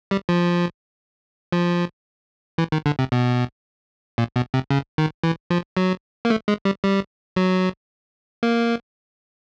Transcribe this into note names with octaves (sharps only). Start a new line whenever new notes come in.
G3
F3
F3
E3
D#3
D3
C3
B2
A#2
B2
C3
C#3
D#3
E3
F3
F#3
A#3
A3
G#3
G3
G3
F#3
A#3